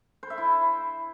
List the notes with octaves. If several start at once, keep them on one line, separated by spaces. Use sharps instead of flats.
C5
E5
E4